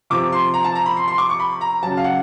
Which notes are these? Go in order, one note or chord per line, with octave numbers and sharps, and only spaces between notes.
C3 F3 D6
C6
A#5
A5
A#5
B5
C6
C6
D6
C#6
B5
A#5
C#3 F#3 A5
F5
F#5